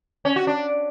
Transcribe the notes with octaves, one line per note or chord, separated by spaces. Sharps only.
C#4
F#4
D4